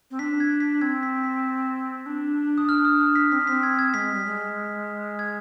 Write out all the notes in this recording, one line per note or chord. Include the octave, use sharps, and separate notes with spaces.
C4
D4 B6
G#6
B6
C4 G#6
B6
B6
D4
D#6
F6
D#6
F6
B6
C4 B6
D4
C4 B6
G#6
G#6
G#3 B6
G3
G#3
G#6